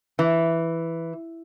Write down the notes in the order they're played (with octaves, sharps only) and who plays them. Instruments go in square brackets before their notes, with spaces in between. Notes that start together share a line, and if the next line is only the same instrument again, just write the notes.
[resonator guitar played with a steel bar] E3